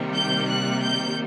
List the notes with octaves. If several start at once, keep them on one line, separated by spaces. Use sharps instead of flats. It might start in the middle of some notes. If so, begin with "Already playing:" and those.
Already playing: C3 D#3 G3 A#3
G6
F#6
G6